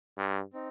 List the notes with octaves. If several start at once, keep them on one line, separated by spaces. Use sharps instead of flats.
G2
C4 D#4